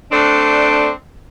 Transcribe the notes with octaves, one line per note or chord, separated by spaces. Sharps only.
A3 C4 D4